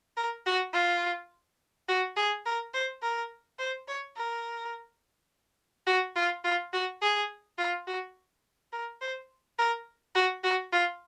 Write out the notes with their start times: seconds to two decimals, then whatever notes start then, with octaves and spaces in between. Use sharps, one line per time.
0.17 A#4
0.46 F#4
0.74 F4
1.88 F#4
2.17 G#4
2.45 A#4
2.74 C5
3.02 A#4
3.59 C5
3.88 C#5
4.17 A#4
5.87 F#4
6.16 F4
6.44 F4
6.73 F#4
7.02 G#4
7.58 F4
7.87 F#4
8.73 A#4
9.01 C5
9.59 A#4
10.15 F#4
10.44 F#4
10.73 F4